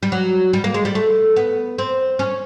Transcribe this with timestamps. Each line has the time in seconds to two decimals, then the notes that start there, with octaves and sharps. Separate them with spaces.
0.03 G3
0.12 F#3
0.53 G3
0.64 A#3
0.74 G#3
0.85 G3
0.95 A3
1.36 B3
1.78 C4
2.19 C#4